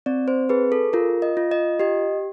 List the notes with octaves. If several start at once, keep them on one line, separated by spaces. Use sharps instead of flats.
C4 D5
C5
G#4 B4
A4
F4 A#4
D#5
F4
D#5
G4 D#5